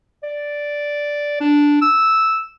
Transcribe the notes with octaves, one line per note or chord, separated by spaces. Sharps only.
D5
D4
E6